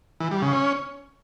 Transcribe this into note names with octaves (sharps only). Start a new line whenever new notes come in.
E3
G3
C#3
C#4